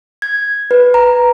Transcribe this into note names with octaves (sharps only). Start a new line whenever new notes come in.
G#6
B4
A#5